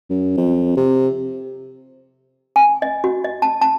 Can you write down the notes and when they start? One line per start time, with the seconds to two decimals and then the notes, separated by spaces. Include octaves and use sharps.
0.10 F#2
0.37 F2
0.77 C3
2.56 G#5
2.82 D#5
3.04 F#4
3.24 D#5
3.42 A5
3.61 A5